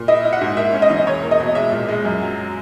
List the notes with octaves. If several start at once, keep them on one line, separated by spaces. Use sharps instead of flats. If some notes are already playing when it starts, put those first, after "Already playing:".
Already playing: A#2
E4 D#5
E4
F#5
G#2
A#3 E5
C#4
D#5
E3
E1 C#5
A#3
D#5
B2
G#3 E5
A#2
G#3
F#2
F#3